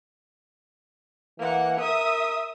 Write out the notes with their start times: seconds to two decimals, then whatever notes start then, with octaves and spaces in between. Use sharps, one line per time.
1.39 E3 A#3 F#5
1.80 A#4 E5 D#6